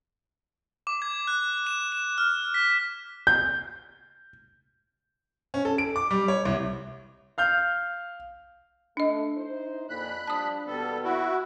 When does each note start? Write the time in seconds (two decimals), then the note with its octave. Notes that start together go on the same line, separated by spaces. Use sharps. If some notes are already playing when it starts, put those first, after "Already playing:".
0.87 D6
1.02 G#6
1.27 F#6
1.67 E7
1.92 E7
2.18 F6
2.54 B6
3.27 G6
5.54 C#4
5.65 A4
5.78 D7
5.96 D6
6.11 G3
6.28 C#5
6.45 C2
7.38 F5 F6 G6
8.97 A3 D4 D#5
9.36 D#4 E4 C5
9.89 F2 A#2 B5 F#6
10.28 F3 G3 D4 A5 D#6
10.67 D#2 B2 G3 B3 A4
11.04 E4 F#4